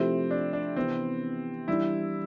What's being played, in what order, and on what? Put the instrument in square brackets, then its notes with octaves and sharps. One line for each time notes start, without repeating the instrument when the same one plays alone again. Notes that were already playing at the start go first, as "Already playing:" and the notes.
Already playing: [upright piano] C3 F3 A3 E4 G4 [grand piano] C4
[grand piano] D4
D4
[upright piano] C3 E3 B3 [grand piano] C4
[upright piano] E3 G3 D4 G4 [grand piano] E4